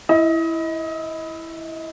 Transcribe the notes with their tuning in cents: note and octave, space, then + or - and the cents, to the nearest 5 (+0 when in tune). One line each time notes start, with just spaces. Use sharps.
E4 +0 D#5 +30